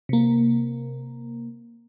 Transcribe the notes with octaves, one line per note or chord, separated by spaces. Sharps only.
C3 A#3